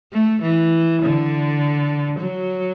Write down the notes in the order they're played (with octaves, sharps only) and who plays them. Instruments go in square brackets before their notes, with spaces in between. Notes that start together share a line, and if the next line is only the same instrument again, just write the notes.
[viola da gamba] A3
E3
D3
F#3